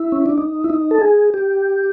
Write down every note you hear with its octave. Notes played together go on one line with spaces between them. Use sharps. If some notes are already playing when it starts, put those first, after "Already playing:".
Already playing: E4
C#4
D4
D#4
E4
D#4
A4
G#4
G4